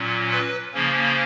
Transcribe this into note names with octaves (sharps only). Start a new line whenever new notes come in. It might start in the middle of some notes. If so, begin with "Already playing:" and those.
Already playing: A#2 F#3 C#4
B4
C#3 F3 A#3 C#4